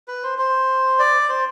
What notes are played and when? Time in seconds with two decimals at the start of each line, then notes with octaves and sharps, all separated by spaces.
0.08 B4
0.23 C5
0.38 C5
0.99 D5
1.29 C5